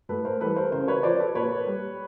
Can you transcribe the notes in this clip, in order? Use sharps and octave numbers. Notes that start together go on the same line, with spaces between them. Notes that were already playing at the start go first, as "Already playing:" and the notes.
A2 A4 B4
A#4 C5
E3 G3 A4 B4
A#4 C5
C#3 A#4 C5
B4 C#5
F3 C5 D5
A4 B4
A#2 B4 C#5
G3